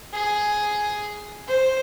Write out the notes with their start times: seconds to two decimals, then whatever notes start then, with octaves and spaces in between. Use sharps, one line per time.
0.13 G#4
1.47 C5